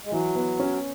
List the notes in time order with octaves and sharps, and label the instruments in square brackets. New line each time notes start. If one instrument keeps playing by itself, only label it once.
[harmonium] G#3
[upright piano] E3 [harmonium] F#3
[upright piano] B3
C#4